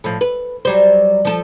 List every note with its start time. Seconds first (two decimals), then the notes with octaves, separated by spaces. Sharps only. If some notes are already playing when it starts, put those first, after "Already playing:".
0.04 A2 F3
0.21 B4
0.65 F#3 G3 C5
1.25 F3 A4